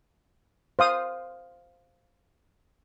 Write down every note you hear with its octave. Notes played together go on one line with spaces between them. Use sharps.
C5 F5 D#6